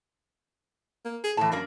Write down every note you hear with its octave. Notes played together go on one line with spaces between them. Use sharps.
A#3
G#4
A2 E3 A5
F#2 A#3 D4 A#4